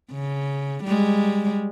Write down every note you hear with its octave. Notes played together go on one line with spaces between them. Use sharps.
C#3
G3 G#3